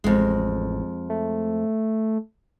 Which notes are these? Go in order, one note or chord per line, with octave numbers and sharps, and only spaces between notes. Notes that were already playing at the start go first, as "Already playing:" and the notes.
A1 F2 G#3
A3